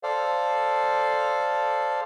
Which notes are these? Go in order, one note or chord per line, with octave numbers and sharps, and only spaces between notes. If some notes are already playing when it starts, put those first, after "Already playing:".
A4 C5 D5 F5